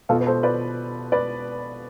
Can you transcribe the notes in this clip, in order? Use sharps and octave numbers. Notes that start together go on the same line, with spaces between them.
B2 F4 A4
B4
A4 C5
B4 D5
B4 D5